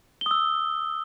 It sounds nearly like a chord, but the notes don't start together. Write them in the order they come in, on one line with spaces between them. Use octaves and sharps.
G7 D#6 E6